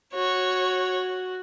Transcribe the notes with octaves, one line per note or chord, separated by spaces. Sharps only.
F#4 C#5